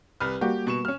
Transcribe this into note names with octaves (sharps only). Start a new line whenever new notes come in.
C2 B4 F6
G3 A#3 F#4 G4
B2 C#6 E7
C#4 F6